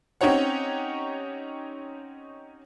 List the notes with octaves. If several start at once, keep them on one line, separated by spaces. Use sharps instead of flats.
C4 C#4 D#4 G4 C#5 F#5